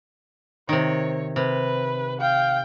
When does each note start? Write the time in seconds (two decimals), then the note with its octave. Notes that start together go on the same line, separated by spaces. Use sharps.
0.69 C3 D#3 C#5
1.36 C3 B4
2.21 F5 G5